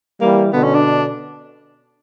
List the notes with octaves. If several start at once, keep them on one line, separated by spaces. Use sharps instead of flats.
E3 G3 A#3
B2 D3 B3
C#4
D4